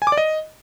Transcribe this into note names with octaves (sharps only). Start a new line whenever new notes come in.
G#5
D6
D5
D#5